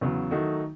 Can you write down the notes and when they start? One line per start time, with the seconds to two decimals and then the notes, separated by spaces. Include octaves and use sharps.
0.01 E2 C#3 F#3 B3
0.31 D#3 F#3 A3 D#4 F#4